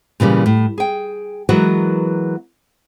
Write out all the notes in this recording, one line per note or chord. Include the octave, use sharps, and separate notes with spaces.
A#2 C#3 E3 G3
A2
G#4 G5
E3 F#3 G#3 B3 F#4 A#4